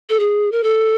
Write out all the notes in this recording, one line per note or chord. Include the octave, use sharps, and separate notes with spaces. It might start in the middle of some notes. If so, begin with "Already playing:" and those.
A4
G#4
A#4
A4